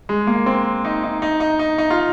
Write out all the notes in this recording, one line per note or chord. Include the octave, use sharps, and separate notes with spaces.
G#3
A#3
C4
D#4
D#4
D#4
D#4
D#4
D#4
F4